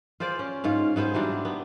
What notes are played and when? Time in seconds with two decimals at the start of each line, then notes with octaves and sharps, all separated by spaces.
0.20 F4 G#4 C5 D5
0.39 C#4
0.64 G#2 F4 F5
0.96 G#2 B3 G#4 C5
1.14 E3 F#3 G3 D4
1.45 B3